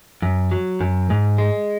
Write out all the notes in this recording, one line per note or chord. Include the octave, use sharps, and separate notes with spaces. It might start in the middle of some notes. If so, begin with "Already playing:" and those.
F#2
F#3
F#2
G#2
G#3